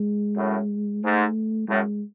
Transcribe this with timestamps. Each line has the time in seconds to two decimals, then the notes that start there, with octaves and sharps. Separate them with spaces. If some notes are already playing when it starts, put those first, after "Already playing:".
Already playing: G#3
0.36 F#2 A2
1.03 G#2 A3
1.68 F#2 A2 G#3